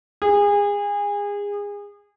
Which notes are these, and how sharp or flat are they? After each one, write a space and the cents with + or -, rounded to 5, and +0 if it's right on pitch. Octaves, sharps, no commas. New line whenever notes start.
G#4 -30